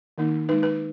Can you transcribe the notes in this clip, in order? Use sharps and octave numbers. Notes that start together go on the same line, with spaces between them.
D#3 A#3 D#4
G#3 D#4 B4
B4